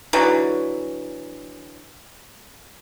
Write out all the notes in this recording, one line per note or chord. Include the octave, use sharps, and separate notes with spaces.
D3 E3 F#3